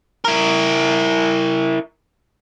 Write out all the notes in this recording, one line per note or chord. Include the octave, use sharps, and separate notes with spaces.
E4 A#4